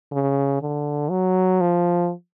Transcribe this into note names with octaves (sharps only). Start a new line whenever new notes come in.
C#3
D3
F#3
F3